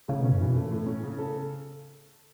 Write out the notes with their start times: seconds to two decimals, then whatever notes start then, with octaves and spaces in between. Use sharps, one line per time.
0.08 A2 C#3
0.21 B2 C#4
0.32 F#2
0.41 B2 E3
0.56 A3
0.71 A2
0.86 C#4
1.03 C#3
1.18 A4